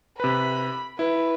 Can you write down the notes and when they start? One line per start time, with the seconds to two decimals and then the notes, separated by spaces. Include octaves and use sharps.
0.20 C3 B4 B5
0.99 E4 B4